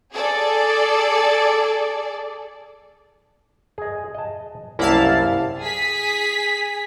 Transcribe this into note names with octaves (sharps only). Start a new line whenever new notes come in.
G#4 A4 D5
G#4 D#5
D#5 A5
C2 F#2 A#3 E4 F5 A5
G#4 B6